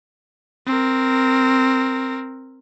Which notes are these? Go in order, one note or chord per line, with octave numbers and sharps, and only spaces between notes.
C4 A#4